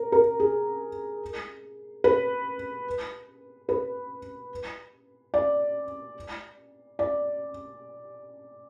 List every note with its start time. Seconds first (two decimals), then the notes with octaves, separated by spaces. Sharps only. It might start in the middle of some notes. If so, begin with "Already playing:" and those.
Already playing: A#4
0.12 A#4
0.40 G#4
2.04 B4
3.69 B4
5.34 D5
6.99 D5